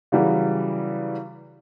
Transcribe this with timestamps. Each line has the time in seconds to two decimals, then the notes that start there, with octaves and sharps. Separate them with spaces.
0.12 C#3 E3 F#3 G3